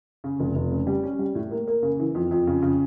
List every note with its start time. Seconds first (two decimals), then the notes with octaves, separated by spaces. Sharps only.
0.24 C#3
0.40 F1
0.55 F1
0.71 C#3
0.87 G3
1.03 C#4
1.19 G3
1.35 A2
1.51 A#3
1.67 A#3
1.83 C#3
2.00 E3
2.15 F2
2.31 F2
2.47 C#3
2.62 C#3